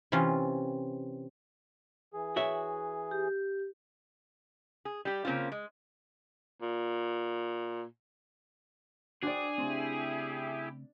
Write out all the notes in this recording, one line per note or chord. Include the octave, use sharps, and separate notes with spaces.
C3 E3 C#4 F4
E3 G#4
F#4 C#5 E5
G4
G#4
G3 G4
C#3 A#3 C4 C#4 F4
G#3
A#2
D4 F#4 G#4 C5 D5 G5
C#3 A3 C4 E4 G4